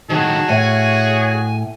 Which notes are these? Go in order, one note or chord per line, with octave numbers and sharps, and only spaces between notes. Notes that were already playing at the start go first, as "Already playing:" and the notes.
A2 D#3 F#3 F#4 G#4 A5
A2 C#5 G#5